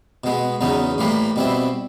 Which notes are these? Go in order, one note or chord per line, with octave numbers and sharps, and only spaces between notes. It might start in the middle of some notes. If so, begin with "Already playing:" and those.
B2 G#3 B3
E2 C#3 F#3 B3 D#4
A2 E3 G3 A#3
B2 G3 C4 E4